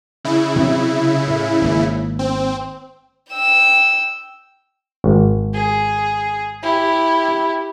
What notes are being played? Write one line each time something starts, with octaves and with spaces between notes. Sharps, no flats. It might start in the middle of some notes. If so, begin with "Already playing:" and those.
C#3 E4
C3 F#3 C4
A2
G#1 A#3
C4
G5 E6
G#1
G#4
E4 G4